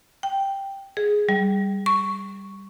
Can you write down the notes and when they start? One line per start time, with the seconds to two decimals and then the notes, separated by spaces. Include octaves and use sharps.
0.23 G5
0.97 G#4
1.29 G3
1.86 C#6